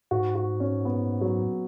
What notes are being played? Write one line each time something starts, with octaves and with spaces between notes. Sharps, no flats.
G#2 F#4
F#4
C#4
B3
F#3